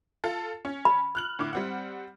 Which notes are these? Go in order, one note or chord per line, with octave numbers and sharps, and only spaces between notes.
F4 A4
C#4
B5
F6 F#6 F#7
A2 D3 D6
G3 C4 F#5